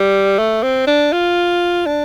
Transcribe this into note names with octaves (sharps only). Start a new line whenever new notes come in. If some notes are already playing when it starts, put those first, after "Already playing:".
Already playing: G3
A3
C4
D4
F4
D4